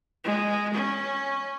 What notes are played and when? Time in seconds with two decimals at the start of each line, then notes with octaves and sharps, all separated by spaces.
0.25 G#3
0.74 C#4